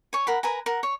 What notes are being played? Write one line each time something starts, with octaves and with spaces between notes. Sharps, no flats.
C#5 G#5
A#4 F#5 B5
A#4 B4 G#5 A#5
A#4 F#5
C#5